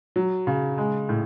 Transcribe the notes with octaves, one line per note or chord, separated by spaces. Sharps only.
F#3
C#3
G#3
A2